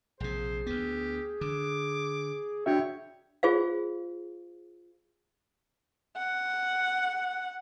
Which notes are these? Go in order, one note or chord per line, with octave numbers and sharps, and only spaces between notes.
A#1 C3 G#4 C5
D2 B3 G4
D3 D6
D4 F#4 C#5 E5 G5
F4 G#4 C5 F5
F#5